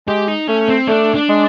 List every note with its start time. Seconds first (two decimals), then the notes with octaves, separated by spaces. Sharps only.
0.07 G#3 G4
0.28 D#4
0.47 A3 C#4
0.69 C4
0.87 A3 D4
1.15 D4
1.29 G#3